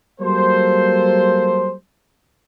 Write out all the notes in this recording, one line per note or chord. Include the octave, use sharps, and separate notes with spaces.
F#3 G3 A#3 A4 C5